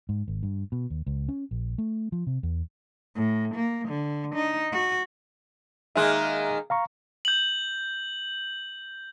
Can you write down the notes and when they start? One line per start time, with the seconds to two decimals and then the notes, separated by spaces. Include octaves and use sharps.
0.09 G#2
0.28 G#1
0.43 G2
0.72 B2
0.90 D#2
1.07 C#2
1.28 C#4
1.51 A#1
1.78 A3
2.12 F3
2.27 C3
2.43 E2
3.16 A2
3.55 A#3
3.89 D3
4.35 D#4
4.72 F#4
5.96 D#3 G#3 A#3 E5 F#6
6.70 F5 A#5 C#6
7.25 G6 F#7